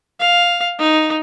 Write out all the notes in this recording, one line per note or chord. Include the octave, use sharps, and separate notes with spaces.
F5
D#4